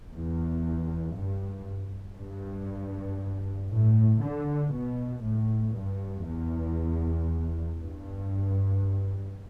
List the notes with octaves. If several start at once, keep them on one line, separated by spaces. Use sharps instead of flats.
E2
G2
G2
A2
D3
B2
A2
G2
E2
G2